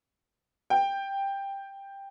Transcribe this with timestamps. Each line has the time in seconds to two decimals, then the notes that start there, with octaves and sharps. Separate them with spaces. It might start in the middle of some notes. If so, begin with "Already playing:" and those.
0.70 G5